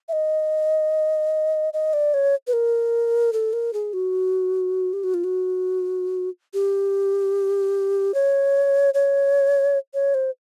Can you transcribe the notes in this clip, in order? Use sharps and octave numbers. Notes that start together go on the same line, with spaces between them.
E5
D#5
D#5
D5
C#5
B4
A#4
A4
A#4
G#4
F#4
G4
F#4
F4
F#4
G4
C#5
C#5
C#5
C5